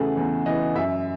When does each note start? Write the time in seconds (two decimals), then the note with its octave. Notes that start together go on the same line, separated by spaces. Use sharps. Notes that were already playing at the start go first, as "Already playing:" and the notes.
Already playing: E2 C#3 E3 A3 F#4 G#4 A4
0.17 E2
0.46 E3 D#5
0.75 F#2 E5